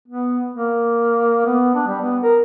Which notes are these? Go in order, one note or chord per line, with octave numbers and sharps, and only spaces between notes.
B3
A#3
B3
D4
G3
B3
A#4